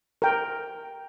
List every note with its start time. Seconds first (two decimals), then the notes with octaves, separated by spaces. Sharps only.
0.22 A#4 G5